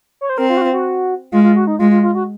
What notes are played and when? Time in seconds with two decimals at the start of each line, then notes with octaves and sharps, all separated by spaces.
0.21 C#5
0.29 C5
0.38 C4 A#4
0.49 F4
0.57 F#4
0.61 F4
0.73 F#4
1.32 G#3 F4
1.44 F4
1.56 F#4
1.67 D#4
1.79 G#3 F4
1.91 F4
2.03 F4
2.15 F#4